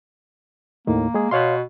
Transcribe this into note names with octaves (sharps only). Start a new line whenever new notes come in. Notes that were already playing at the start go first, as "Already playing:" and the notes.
D#2 A2 D#3 A#3
G#3 G#4
B2 C#5 F5 C6